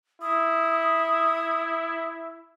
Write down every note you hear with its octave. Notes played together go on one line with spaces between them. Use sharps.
E4 D#6